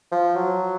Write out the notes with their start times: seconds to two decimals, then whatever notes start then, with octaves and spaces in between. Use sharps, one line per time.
0.12 F3
0.35 F#3